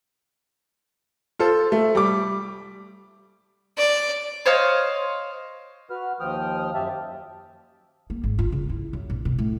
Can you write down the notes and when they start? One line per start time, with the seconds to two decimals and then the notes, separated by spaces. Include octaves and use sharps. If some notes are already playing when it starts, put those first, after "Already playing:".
1.39 F4 A4 C5
1.72 A3
1.95 G3 D6
3.78 D5
4.46 C5 C#5 D#5 F5
5.90 F#4 B4 F6
6.20 D#2 F3 G5 D#6 F6
6.75 F#2 G4 E5 A5
8.10 A#3
8.24 G#1
8.39 F4
8.52 C#3
8.69 E4
8.93 F#2
9.10 A#1
9.25 B2
9.39 A2